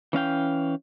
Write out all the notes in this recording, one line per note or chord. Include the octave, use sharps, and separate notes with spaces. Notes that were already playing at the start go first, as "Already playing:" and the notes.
E3 C#4 F5 G5